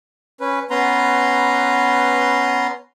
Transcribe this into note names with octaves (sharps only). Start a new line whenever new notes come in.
C#4 B4
B3 C#4 B4 A#5 C6